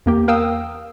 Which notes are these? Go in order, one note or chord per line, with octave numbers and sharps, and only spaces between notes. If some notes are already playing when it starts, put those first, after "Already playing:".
E2 A#3 G4
A#4 F5 G5 D#6 E6